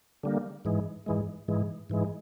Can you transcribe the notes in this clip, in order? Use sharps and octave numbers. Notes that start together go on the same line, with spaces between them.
D3 G3 A#3
G#2 E3 G#3
G#2 E3 G#3
G#2 E3 G#3
G#2 E3 G#3